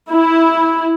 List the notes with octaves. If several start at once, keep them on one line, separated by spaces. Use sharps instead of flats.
E4